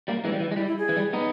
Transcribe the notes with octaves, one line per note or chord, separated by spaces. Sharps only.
G3 A#3
E3 G#3
G3
E3
G#3
G3 E4
E4
G#4
E3
G3
B3 D#4